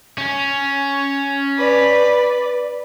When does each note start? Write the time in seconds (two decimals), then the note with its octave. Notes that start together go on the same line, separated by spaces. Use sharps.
0.18 C#4
1.58 B4 D5